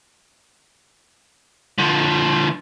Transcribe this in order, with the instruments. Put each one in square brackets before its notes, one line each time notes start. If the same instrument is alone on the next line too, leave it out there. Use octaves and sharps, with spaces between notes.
[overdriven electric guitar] D3 F3